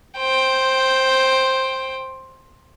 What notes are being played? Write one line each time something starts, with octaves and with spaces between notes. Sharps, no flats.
C5 G5